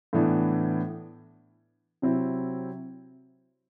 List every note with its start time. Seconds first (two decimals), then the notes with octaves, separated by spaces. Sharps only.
0.13 A2 E3 B3 D4
2.02 C3 F#3 C4 E4